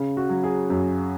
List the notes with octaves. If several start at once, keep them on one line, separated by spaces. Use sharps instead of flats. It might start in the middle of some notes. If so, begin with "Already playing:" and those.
Already playing: C#3
F#4
F#3
G#4
F#2